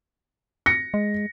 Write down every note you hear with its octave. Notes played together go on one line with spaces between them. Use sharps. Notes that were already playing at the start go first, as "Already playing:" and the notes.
A#6 C#7
G#3